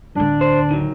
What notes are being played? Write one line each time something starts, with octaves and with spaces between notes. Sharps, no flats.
D1 D3 D4
C5
D#3 F#3